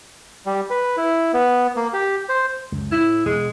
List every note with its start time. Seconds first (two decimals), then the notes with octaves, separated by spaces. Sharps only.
0.46 G3
0.70 B4
0.97 E4
1.33 B3
1.76 A#3
1.93 G4
2.29 C5
2.72 C#2 F#2
2.92 A2 E4
3.26 E1 G#3